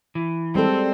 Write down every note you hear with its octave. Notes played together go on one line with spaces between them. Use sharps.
E3
G3 G#3 C4 A4